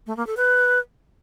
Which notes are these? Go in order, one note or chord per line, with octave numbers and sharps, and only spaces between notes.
A3
A#3
A4
B4